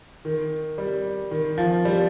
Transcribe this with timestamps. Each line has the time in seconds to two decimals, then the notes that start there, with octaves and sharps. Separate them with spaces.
0.25 D#3
0.78 G3
1.31 D#3
1.58 F3
1.85 G3